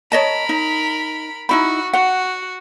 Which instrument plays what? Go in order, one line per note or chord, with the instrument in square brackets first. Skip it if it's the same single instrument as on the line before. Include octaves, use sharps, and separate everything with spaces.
[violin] A#4 B5 [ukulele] C#5 D#5 A5
[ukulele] D#4
[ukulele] D#4 E4 B5 [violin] F#4
[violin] F#4 [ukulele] F#5